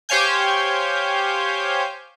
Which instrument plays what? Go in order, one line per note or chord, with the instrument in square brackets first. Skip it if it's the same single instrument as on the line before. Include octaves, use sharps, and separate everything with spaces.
[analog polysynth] G4 C5 C#5 F5 G#5 G6